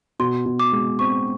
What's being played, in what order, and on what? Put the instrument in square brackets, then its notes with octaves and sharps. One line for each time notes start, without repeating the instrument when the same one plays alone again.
[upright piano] B2 [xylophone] C6
[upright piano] B2
[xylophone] D6
[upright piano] G#3
[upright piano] C4 [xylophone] C#6